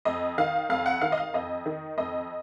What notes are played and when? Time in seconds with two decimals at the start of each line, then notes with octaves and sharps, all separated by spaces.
0.05 F2 D#5
0.38 D#3 F5
0.69 F2 F5
0.86 F#5
1.01 D#3 F5
1.12 D#5
1.18 F5
1.34 F2 D#5
1.66 D#3
1.98 F2 D#5